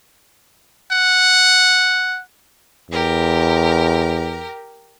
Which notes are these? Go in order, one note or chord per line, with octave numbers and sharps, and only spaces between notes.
F#5
E2 G4 A#4